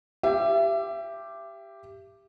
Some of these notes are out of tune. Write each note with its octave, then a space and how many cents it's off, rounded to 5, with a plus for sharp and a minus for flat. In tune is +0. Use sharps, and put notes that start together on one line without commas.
G4 +0 E5 +30